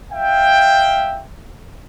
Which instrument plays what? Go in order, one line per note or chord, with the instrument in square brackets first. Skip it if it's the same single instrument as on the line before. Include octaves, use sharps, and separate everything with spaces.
[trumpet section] E5 F5 G5